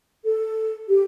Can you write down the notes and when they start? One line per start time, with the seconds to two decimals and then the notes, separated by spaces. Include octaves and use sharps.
0.24 A4
0.89 G4